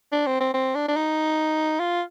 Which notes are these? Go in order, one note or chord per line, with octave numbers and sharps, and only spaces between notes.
D4
C4
C4
C4
D4
D4
D#4
F4